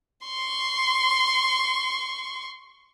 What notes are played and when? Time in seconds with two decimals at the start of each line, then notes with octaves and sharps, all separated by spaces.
0.24 C6 C#6